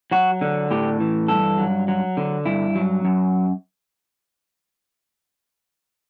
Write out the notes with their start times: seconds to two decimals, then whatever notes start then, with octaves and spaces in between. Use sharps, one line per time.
0.11 F#3 F#4
0.41 D3
0.71 A2 G4
1.00 E3
1.28 G2 A4
1.58 F#3
1.88 F#3
2.17 D3
2.46 G2 E4
2.75 F#3
3.05 F#2